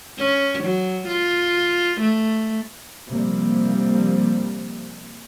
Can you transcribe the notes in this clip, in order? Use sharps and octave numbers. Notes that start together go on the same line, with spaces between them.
C#4
F#3
F4
A3
C3 F3 G3 A#3